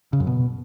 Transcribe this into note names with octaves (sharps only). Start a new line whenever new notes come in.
C#3
F#2
B2